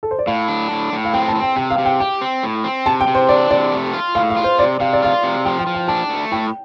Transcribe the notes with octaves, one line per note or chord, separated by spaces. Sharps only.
A4
C5
D5
A2 F5
D4
A2
A2
F5
C4 G5
A5
C4
G5
C3 G5
F5
C3
G5
G4 G5
C4
A2
C4
C3 A5
G5
C3
C5
D4 D5
C3 D5
A3
F4
A2 F5
F5
F4
C5
C3 D5
C3 F5
D5
F4 F5
C3
F3 G5
G5
F3
G5
D4 A5
A3
A2 G5